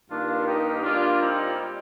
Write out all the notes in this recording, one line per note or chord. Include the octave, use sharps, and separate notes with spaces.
G2 D#3 A#3 D4 F4
D#4 G4
A#2 G3 A#3 D4 F4
C4 D#4